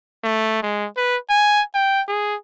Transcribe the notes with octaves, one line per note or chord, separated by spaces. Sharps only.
A3
G#3
B4
G#5
G5
G#4